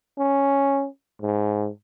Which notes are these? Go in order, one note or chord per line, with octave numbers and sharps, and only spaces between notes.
C#4
G#2